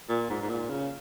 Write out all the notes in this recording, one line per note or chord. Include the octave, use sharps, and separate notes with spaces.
A#2
G#2
G#2
A#2
C#3